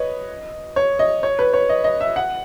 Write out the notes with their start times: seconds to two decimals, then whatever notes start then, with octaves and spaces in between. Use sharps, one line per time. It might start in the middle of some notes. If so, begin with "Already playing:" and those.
Already playing: B4 C#5 D#5
0.76 C#5
0.99 D#5
1.23 C#5
1.39 B4
1.53 C#5
1.69 D#5
1.84 D#5
2.00 E5
2.16 F#5